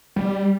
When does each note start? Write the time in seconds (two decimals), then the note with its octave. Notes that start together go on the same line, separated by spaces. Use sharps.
0.16 G3